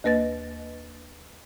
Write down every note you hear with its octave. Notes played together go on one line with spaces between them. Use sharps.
D#2 A#3 B4 D#5 A6